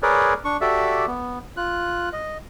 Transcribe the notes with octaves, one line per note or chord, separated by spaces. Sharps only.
G#4 A#4 B4 C#5 D5
D4 C#6
F#4 G4 A4 D5 E5
B3
F4 F#6
D#5